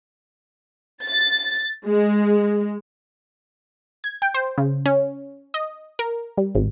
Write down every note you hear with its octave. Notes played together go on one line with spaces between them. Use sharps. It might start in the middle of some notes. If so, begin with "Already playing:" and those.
A6
G#3
G#6
G5
C5
C#3
C#4
D#5
A#4
G3
G#1